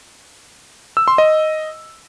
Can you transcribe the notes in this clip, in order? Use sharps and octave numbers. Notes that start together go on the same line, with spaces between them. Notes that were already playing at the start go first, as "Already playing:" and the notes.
E6
C6
D#5